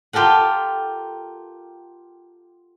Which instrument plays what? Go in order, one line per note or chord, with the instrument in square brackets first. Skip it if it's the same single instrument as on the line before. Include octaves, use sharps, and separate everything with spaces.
[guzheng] F4 G4 A4 A#4 F#5